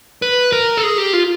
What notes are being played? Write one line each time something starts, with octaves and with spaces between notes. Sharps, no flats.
B4
A#4
A4
G#4
G4
F4